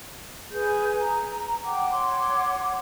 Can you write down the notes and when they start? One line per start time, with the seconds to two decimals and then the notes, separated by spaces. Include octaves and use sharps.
0.52 G#4 B4 G6
0.99 A#5
1.65 F#5 G5 D6
1.90 C#5 F#5 C6 D6